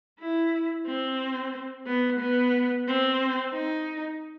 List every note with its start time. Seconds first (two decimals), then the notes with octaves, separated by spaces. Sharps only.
0.19 E4
0.86 C4
1.86 B3
2.20 B3
2.87 C4
3.54 D#4